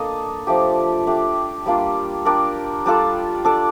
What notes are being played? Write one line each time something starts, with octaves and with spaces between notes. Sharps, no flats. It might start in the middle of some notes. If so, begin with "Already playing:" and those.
Already playing: A#3 D4 A4 D#5
F3 A3 D4 G4
A3 D4 G4
G3 A#3 D4 F4
D4 G4 A#4
G3 D4 F4 A4
D4 A4 D5